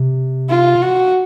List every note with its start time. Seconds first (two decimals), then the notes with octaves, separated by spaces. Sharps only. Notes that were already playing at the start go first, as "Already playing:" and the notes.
Already playing: C3
0.50 F4
0.82 F#4